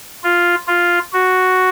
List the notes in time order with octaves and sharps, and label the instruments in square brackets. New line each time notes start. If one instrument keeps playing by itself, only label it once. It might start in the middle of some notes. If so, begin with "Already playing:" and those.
[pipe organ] F4
F4
F#4